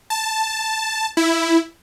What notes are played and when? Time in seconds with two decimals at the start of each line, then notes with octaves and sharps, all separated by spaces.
0.10 A5
1.17 E4